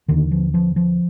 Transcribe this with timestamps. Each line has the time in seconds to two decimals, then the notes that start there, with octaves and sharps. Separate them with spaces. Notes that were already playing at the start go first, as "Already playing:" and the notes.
0.08 D#2 D3 D#3
0.31 F3
0.54 F3
0.76 F3